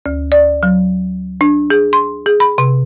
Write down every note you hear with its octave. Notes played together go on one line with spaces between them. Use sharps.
D2
D5
F#3
D4
G#4
C6
G#4
B5
C3